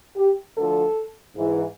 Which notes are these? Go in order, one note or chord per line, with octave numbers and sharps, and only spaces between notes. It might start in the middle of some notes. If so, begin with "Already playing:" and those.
G4
D2 D3 F3 A4
G#2 E3